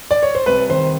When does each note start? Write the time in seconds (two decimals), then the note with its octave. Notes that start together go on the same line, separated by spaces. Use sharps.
0.11 D5
0.23 C#5
0.35 C5
0.46 C2 B4
0.69 D#3 C5